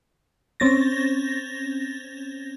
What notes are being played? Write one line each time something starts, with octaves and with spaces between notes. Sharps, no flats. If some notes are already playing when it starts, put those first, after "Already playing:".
C4 C#4 A6 A#6